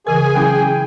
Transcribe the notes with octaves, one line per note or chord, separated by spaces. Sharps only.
C#3 E3 G#4 A#4 G#5
F#3 C#4 E4 G5